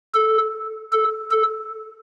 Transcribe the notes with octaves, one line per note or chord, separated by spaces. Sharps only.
A4
A4
A4